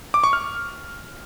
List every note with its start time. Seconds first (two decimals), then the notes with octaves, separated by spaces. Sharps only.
0.14 D6
0.24 C#6
0.33 F6